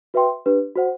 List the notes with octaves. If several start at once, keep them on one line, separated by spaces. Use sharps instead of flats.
F#4 B4 E5 G5 C6
D4 G4 B4
F#4 C5 F#5